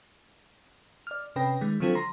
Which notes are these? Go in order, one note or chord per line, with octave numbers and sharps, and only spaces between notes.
D5 F6
C3 C#4 B4 G5 A#6
D#3 G#3
D3 F3 F#3 C4 F4 A4
A#5 C6 A#6